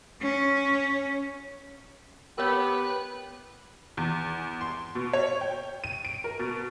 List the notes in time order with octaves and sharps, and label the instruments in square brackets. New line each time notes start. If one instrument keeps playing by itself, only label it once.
[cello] C#4
[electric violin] B3 [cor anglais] G4 [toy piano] A#4 C#5 [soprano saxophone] B4
[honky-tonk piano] E2
C6
B2
C#5
G5
D#7
D7
A#4
B2